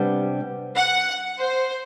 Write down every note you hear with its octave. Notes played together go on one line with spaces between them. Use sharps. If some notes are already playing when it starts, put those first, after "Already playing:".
Already playing: C3 G3 B3 D4
F#5
C5